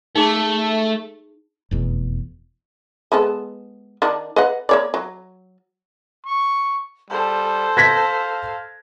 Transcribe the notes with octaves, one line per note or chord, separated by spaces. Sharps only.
A3 D#4 G#4 A5
F1 E2 B2
G#3 B3 A4
D#3 D4 F#5
B4 D#5 F#5
A#3 C#5 D5
F#3
C#6
G3 A4 C5
F5 G#6 A#6 B6